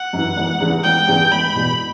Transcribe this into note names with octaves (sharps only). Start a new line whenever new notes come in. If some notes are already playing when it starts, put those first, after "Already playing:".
Already playing: F#5
F#2 E3
E1
E2 C#3 E3
E1 G5
E2 C#3 E3
E1 B5
E2 B2